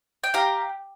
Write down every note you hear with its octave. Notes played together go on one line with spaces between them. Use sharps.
G5
G4 F5 A#5